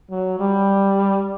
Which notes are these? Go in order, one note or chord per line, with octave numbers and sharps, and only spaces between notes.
F#3
G3